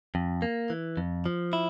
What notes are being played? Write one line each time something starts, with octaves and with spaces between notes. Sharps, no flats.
F2
A#3
E3
F2
F3
E4